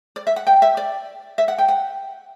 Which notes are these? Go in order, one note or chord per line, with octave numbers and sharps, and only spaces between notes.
D5
E5
F#5
G5
E5
D5
E5
F#5
G5
F#5